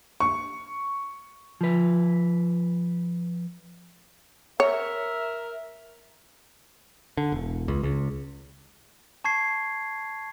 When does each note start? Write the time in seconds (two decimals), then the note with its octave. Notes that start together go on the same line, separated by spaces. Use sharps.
0.20 C#6
1.61 F3 B4
4.60 A#4 C#5 E5
7.17 D3
7.32 E1
7.68 C#2
7.83 C#2
9.24 A5 C#6 G#6 C7